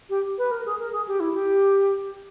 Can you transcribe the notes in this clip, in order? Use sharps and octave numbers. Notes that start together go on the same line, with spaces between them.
G4
B4
A#4
G#4
A#4
G#4
G4
E4
G4